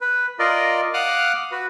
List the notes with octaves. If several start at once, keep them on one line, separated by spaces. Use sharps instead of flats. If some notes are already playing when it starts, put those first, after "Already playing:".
B4
F4 A#4 D5 D#5
F5 F#5 D6 D#6 F6 F#6
F#4 B4